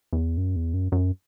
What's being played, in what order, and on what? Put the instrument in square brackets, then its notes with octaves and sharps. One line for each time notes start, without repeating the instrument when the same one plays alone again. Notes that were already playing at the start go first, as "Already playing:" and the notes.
[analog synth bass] E2
F#2
E2
F#2
F#2